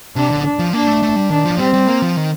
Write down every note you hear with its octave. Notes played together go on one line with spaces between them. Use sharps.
C3 D4
D3
D4
F3
A#3 D4
A3
A3
G3
D#3 D4
F3
G3 C4
G3
A#3
F3
D#3